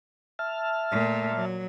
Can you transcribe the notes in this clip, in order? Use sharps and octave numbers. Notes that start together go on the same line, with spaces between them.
E5 A5 F6
A#2 A3
F#3